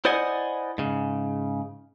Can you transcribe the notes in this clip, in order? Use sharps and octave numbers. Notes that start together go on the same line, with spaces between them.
E4 C5 D5 D#5 F#5 G#5
G#2 C#3